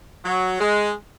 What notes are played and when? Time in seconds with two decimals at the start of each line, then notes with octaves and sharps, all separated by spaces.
0.25 F#3
0.61 G#3